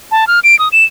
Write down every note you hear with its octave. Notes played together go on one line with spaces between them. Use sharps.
A5
F6
D7
D#6
E7